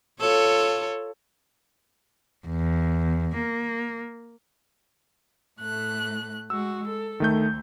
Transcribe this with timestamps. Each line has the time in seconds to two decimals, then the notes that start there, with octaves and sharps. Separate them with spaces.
0.19 F4 A4 C#5
2.48 E2
3.37 A#3
5.60 A2 A3 F#6
6.50 G#3 F#4 E6
6.87 A4
7.20 D2 D#3 A3 G6